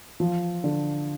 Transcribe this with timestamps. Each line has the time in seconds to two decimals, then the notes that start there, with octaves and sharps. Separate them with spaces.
0.20 F3
0.64 D3